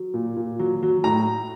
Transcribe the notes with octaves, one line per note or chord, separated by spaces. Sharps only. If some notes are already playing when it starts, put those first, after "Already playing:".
Already playing: F#3
A#2
A#2
F#3
F#3
A2 A#5